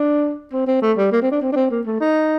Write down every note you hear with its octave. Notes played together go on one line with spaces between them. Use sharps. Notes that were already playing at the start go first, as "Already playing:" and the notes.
Already playing: D4
C4
C4
A3
G3
A#3
C4
D4
C4
D4
C4
A#3
A3
D#4